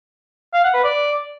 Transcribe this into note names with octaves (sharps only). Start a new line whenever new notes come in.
F5
F#5
B4
D5